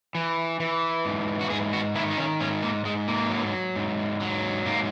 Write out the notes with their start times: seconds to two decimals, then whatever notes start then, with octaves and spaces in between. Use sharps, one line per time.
0.15 E3
0.60 E3
1.05 G#2
1.41 F#4
1.50 G#2 G#4
1.73 F#4
1.95 D#3 E4
2.11 D#4
2.17 C#4
2.41 G#2 C#4
2.63 A#3
2.85 G#2 G#3
3.08 A#3
3.30 F#3
3.76 G#2
4.20 F#3
4.66 G#2 A#3